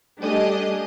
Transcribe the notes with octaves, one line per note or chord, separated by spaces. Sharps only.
G3 A3 D4 G4 G#4 D#5